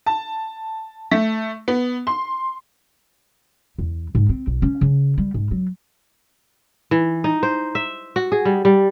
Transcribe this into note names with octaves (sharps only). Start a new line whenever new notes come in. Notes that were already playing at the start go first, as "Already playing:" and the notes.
A5
A3
B3
C6
E2
G#2
C4
B1
C#4
C#3
G3
G#2
F#3
E3
D#4
C5
E5
F#4
G#4
G3
G3